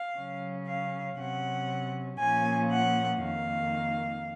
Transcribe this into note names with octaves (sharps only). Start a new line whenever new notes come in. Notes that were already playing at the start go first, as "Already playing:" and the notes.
Already playing: F5
C#3 F#3 C#4
F5
C3 F#3 C#4 F#5
A#2 F3 A#3 C#4 G#5
F#5
F2 D#3 A#3 F5